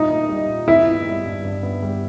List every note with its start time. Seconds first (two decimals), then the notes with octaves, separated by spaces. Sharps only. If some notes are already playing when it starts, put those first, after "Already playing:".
Already playing: A#2 G3 A#3 D#4 E4
0.10 A#3
0.29 G3
0.48 A#2
0.68 G2 E4
0.87 B3
1.06 G3
1.25 G2
1.45 G2
1.63 B3
1.82 G3